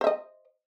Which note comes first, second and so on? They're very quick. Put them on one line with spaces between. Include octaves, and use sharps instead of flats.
C5 E5 D#5